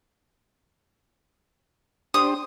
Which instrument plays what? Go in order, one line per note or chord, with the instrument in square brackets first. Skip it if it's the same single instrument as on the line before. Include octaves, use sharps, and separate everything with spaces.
[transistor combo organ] D4 G4 C5 [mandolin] D#6